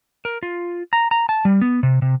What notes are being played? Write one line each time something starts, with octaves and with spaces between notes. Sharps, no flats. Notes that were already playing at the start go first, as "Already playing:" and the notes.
A#4
F4
A#5
A#5
A5
G3
B3
C3
C3